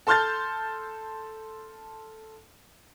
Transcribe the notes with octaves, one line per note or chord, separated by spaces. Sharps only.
A4 A5 C6 F6 G6 A6